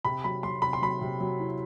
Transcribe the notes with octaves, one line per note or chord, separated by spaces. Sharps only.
C3 B5
F#3 B5
F#3 C6
C3 B5
C6
F#3 B5
C3
F#3
E4